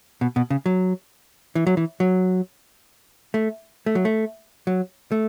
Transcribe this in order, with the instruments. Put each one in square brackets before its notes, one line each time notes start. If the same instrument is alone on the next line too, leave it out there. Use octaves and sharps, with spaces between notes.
[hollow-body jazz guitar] B2
B2
C#3
F#3
E3
F#3
E3
F#3
A3
A3
F#3
A3
F#3
A3